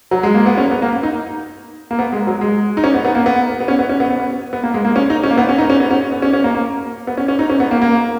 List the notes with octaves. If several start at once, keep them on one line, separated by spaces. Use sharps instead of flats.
F#3
G#3
A#3
B3
C#4
B3
A#3
D#4
A#3
B3
G#3
F#3
G#3
D#4
C#4
B3
B3
A#3
B3
B3
C#4
B3
C#4
B3
B3
B3
A#3
G#3
A#3
C#4
D#4
C#4
A#3
B3
C#4
D#4
C#4
B3
C#4
B3
C#4
C#4
A#3
A#3
B3
C#4
C#4
D#4
C#4
B3
A#3
A#3